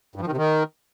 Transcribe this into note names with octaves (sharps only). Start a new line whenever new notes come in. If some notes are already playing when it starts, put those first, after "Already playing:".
G2
F3
D#3
C3
D#3